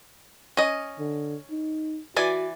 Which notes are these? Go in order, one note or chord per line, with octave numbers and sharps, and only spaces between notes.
C#4 D#5
D3
D#4
E3 F#4 D5 G#5